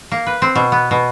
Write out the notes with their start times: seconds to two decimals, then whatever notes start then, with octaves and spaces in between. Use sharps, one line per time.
0.12 A#3
0.26 B4
0.42 C4
0.55 B2
0.72 B3
0.91 B2